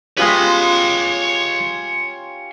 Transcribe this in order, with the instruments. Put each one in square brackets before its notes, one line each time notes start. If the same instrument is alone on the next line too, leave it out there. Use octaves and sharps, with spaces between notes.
[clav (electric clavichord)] G#3 B3 B4 [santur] C#4 F4 G4 [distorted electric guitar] C#5 C6